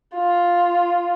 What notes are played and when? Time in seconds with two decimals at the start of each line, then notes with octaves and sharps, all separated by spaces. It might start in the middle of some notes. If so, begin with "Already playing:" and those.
0.15 F4